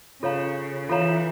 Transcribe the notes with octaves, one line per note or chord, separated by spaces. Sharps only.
C#3 F4 A4 C#5 F5 A#5
E3 F4 A4 C#5 F5 A#5